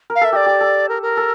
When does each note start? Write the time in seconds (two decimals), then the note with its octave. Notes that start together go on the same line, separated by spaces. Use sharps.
0.10 A#4
0.15 F5
0.21 A4 E5
0.32 G4 D5 E5
0.46 G4
0.61 A4
0.89 A#4
1.02 A#4
1.17 A4